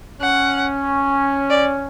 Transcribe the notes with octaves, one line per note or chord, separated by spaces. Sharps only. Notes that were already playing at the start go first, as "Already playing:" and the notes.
C#4 F#5
D5